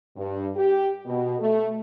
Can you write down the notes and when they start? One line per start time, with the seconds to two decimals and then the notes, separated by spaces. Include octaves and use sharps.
0.17 G2
0.56 G4
1.06 B2
1.40 A3